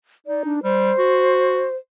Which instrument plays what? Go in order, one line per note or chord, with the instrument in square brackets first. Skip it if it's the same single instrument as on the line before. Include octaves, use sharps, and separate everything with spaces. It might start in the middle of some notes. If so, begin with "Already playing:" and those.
[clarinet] D#4 [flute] D5
[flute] D4
[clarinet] G3 [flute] C5
[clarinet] F#4